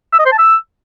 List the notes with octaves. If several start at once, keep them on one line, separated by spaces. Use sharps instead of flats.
E6
D#5
C5
A5
E6